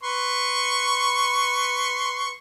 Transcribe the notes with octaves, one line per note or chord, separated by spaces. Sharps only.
B4 C6 C#6